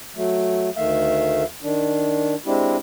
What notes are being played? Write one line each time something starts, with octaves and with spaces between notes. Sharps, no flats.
F#3 A3
D2 D#3 A3 E5 F5
D#3 D4
G#3 C4 D4 E4 G4